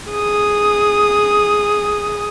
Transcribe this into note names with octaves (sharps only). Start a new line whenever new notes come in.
G#4 D#6